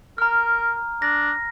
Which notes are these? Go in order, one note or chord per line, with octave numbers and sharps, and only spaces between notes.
A#4 A#5 F6
D4 A#6